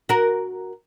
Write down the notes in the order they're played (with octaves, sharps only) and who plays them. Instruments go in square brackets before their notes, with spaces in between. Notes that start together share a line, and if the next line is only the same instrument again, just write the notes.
[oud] F#4 A#4